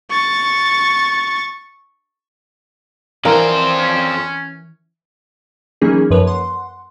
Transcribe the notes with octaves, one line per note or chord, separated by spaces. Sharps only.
C#6 A6
F2 E3 A#4 C5 D5 F5
C#4
E3 F#3 A#3 C#4 D#4 G#4
F#2 F3 B4 C#5
F#5 C6